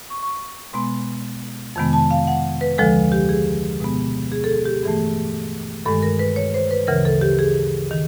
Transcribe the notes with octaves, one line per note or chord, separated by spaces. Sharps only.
C#6
C#6
B2 G#3 B3 C6
F2 C3 D#3 G#3 B3
A5
F5
F#5
B4
D2 D3 F3 G#3 A4
G4
G#4
B2 G#3 B3
G#4
A4
G#4
G4
G2 E3 A3 G#4
G2 D#3 G#3 A4
A#4
B4
C#5
C5
B4
D2 C#3 E3 A#4
A4
G4
G#4
D#3